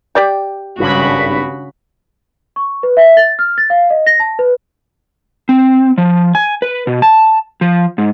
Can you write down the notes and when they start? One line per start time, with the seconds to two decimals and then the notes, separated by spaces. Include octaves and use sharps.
0.15 G4 D5 G5
0.78 G#1 G2 C#3 F#4 B5
2.56 C#6
2.83 B4
2.97 E5
3.17 A6
3.39 F6
3.58 A6
3.70 F5
3.90 D#5
4.07 A#6
4.20 A5
4.39 B4
5.49 C4
5.98 F3
6.35 G#5
6.62 B4
6.87 B2
7.02 A5
7.61 F3
7.98 G#2